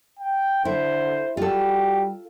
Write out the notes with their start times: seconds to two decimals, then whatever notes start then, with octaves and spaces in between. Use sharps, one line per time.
0.19 G5
0.65 D3 E4 C5
1.37 G3 F4 F#4 A4